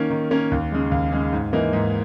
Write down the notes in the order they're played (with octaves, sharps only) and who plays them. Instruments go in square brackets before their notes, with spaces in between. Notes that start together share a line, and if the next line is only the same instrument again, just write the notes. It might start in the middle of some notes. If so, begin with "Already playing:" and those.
Already playing: [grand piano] D#3 A#3 C#4
D#3
A#3 C#4
D#2
C#3 G#3
D#2
C#3 G#3
G#2
E3 A#3 D#4
G#2